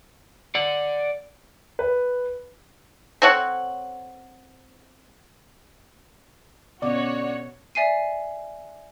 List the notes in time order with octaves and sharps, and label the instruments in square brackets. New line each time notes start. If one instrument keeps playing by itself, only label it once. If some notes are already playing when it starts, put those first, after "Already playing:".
[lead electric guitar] D5 F#5
[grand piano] B4
[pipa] C4 A4 C#5 F#5
[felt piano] B2 [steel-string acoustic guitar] D3 C#4 F4 [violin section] F#4 C#5 [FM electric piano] D5
[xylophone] D5 E5 G#5 C7 D#7